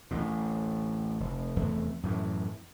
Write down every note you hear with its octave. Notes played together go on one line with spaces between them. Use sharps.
A1 D2 A2
F1
F1 E2 A3
F#2 A2 E3